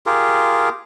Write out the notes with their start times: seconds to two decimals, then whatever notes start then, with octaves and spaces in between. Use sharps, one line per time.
0.06 F4 G4 G#4 A#4